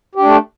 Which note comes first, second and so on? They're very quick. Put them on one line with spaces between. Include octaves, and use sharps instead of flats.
G4 D4 A3